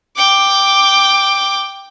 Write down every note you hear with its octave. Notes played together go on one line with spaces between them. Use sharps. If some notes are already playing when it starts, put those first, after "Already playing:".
G5 D6